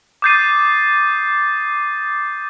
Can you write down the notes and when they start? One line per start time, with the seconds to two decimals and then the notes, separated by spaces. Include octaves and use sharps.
0.22 D6 D#6 G6 A6 C7 D#7